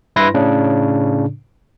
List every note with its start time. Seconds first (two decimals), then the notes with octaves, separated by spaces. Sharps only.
0.16 G2 E4 B4 C6 A#6
0.34 A2 C#3 D4